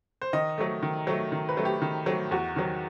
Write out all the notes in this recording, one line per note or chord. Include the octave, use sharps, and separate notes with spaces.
C5
D#3 D#5
F#3 A3
D#3
F#3 A3
D#3
B4
F#3 A3
G4
D#3
F#3 A3
E2 F#4
D#3 F#3